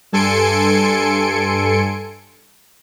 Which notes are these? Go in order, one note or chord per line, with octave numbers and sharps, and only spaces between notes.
G2 A4 G#5 C6 C#7 D7